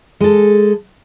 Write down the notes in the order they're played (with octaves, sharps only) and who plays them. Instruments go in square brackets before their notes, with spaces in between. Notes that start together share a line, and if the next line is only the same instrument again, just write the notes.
[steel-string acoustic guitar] G#3 A4